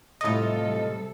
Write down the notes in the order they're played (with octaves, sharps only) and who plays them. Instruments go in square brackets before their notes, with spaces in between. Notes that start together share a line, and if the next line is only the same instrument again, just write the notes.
[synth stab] A2 D#5 [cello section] C3 G3 A4 [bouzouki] D#4 F4